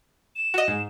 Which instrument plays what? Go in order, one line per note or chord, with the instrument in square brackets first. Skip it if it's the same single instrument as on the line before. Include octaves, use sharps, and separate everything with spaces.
[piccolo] E7
[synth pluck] F#4 D#5
G#2